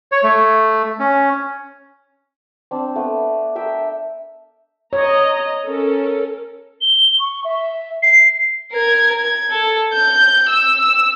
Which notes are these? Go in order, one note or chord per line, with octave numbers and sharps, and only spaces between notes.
C#5
A3
C#4
C4 D4
A3 B3
A#4 E5 G5 E6
C#5 D#5 A#5
C#4 A4 A#4
G7
C#6
E5
C7
A#4 G#6
G#6
A4
G6
E6